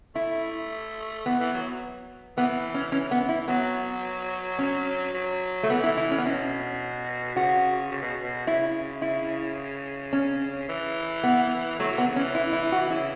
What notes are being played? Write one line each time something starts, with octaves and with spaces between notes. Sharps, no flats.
A3 E4
E3 B3
E3
F#3
E3 B3
C#4
E3 C#4
B3
E4
F#3 B3
C#4
F#3
A3
E3 B3
E4
E4
C#4
B3
B2 C#4
C#3 F#4
C#3
B2
B2
C#3 E4
E4
C#4
E3
B3
F#3 A3
E3
B3
C#3
C#4
E3
E4
E4
F#4
C#3 E4